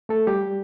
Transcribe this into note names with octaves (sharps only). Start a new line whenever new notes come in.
A3 A4
G3 G4